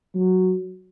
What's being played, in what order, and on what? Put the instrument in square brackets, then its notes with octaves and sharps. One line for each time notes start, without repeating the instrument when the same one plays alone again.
[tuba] F#3